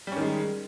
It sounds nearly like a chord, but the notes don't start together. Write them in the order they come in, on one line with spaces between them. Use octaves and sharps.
G3 C#4 D#3 G#3